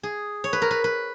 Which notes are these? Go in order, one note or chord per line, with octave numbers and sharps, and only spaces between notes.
G#4
C#5
B4
A#4
B4
B4